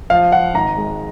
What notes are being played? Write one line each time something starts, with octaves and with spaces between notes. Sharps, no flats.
F3 F5
F3 F#5
G#1 A#5
G#3